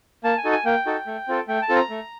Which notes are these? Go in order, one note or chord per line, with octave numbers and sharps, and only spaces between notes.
A#3 A5
G#5
D#4 F#4 A4
G#5
A#3 G5
D#4 F#4 A4
A3
C4 F4 A4
A3 G5
A5
C4 F4 A4
A#5
A3